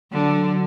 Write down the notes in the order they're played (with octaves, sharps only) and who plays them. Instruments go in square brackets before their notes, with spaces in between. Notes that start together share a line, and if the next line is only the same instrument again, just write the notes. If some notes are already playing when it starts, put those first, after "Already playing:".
[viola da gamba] D3 [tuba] F#3